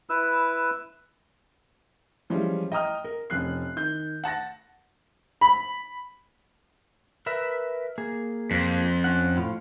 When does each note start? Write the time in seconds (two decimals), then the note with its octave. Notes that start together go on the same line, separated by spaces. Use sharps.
0.10 E4 B4 E6
2.30 E3 F3 G3 G#3 C#4
2.72 D#5 G5 A#5 D#6 F6
3.04 A#4
3.30 F1 C#4 F#6 C7
3.76 D#3 G6
4.24 F#5 A5 A6 A#6
5.41 B5
7.26 A#4 B4 E5
7.98 A#3 G#4
8.51 F2
9.04 C#4 F#5
9.37 A2 F4